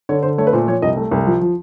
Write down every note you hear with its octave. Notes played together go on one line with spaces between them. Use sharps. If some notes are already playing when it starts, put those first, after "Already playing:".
D3 C#5
D3 C5
A3 C#5
B4
A#2 C5
F3 C#5
C2 D#5
A3
C2
F3
F3